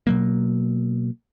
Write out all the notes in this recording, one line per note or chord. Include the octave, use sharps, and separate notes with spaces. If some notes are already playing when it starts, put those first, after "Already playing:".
B2 F#3 A#3